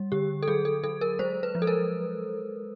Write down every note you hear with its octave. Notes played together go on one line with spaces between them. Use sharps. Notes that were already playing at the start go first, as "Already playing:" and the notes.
Already playing: G3
D3 G4
A4
F#3 G#4
A4
F#3 A4
A#4
G#3 C5
B4
F3
A4
A#4